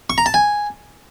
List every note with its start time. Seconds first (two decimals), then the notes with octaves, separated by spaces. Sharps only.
0.10 C#6
0.18 A#5
0.26 A5
0.34 G#5